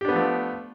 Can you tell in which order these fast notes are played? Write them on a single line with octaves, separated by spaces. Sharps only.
G4 D4 B3 F3 A3